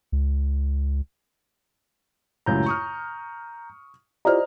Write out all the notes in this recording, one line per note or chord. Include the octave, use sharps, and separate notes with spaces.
C#2
C#2 F#2 A2 A#5 G6
C#6 D#6 F6
E4 F4 G4 C5 D5 D#5 A#5 F6